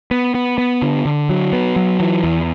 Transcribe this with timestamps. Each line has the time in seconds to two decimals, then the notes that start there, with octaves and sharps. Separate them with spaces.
0.11 B3
0.35 B3
0.58 B3
0.82 D3
1.05 D3
1.29 F#3
1.53 B3
1.76 F#3
2.00 E3
2.24 E2